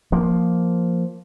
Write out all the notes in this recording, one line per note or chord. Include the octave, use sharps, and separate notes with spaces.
F3 A#3